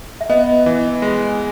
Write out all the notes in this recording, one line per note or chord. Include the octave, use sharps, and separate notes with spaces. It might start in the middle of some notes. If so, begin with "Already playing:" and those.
E5
B3 D#5
E3
G#3